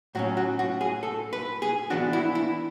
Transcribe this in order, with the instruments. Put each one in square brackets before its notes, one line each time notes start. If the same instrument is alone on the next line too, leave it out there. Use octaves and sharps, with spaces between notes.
[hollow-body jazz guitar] A2 F#3 C#4 F#4
F#4
F#4
G#4
A4
B4
G#4
E3 B3 D4 F#4
E4
E4